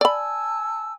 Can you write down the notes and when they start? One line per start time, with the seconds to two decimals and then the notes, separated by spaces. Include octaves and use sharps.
0.01 D5 G#5 A5 B5 E6